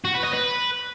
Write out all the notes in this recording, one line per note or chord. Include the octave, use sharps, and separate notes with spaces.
F#4
B4
D#5
B4